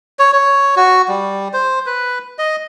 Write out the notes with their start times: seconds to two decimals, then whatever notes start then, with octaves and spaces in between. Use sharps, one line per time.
0.19 C#5
0.33 C#5
0.76 F#4
1.08 G3
1.53 C5
1.86 B4
2.39 D#5